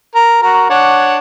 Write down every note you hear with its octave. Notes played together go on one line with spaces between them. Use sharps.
A#4
F#4 A#4
D4 C#5 F#5